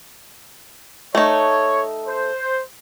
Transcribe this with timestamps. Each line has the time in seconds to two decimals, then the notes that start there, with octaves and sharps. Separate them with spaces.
1.15 A3 D#4 C#5
2.07 C5